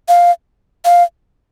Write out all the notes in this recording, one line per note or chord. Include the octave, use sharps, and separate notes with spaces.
F5
F5